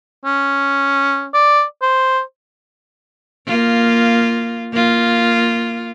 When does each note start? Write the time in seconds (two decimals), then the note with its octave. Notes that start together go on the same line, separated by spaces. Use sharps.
0.25 C#4
1.34 D5
1.82 C5
3.46 A#3 F4
4.72 A#3 F4